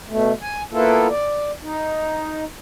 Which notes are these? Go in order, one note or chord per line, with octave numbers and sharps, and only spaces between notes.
B2 A3
G#5
A#3 B3 E4 F4 A4
D5
D#4